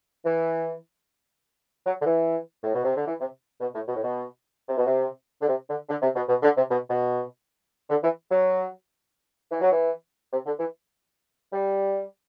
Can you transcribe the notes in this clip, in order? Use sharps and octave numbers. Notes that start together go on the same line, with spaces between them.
E3
F#3
D3
E3
A2
B2
C3
D3
E3
C3
B2
A2
B2
A2
B2
C3
B2
C3
D3
C3
D3
D3
C3
B2
B2
D3
C3
B2
B2
D3
E3
F#3
E3
F#3
E3
C3
D3
E3
G3